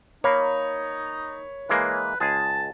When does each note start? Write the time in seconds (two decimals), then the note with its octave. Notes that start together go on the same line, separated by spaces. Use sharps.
0.24 A#3 D#4 C#5 B5
1.69 E3 G#3 A#3 B4
2.20 C#2 G#3 G#4 A5